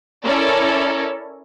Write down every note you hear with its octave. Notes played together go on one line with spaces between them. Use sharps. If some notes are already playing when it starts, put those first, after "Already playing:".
C#4 E4 A4 A#4 C#5 D5